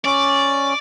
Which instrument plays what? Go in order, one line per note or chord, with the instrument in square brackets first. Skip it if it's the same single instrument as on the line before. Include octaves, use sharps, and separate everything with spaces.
[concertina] C#4 [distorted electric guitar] D5